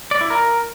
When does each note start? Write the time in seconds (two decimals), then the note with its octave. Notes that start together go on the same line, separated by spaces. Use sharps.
0.11 D5
0.21 E4
0.30 A#4